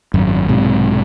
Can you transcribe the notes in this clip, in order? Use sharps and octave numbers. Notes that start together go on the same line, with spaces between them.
G#1 F#2
B1 G#2 C3